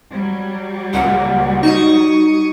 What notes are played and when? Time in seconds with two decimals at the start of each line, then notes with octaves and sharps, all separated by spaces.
0.11 F#3 G3
0.93 C#2 A#2 F#5
1.63 D#4 F#4 C#6 D#6